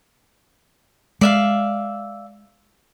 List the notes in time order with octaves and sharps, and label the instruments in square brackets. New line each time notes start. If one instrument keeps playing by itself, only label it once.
[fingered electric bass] G#3 [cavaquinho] D5 E5 F5